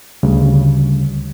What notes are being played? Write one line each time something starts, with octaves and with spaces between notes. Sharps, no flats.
D2 C#3 G3